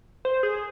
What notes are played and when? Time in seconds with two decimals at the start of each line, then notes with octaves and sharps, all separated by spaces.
0.25 C5
0.43 G#4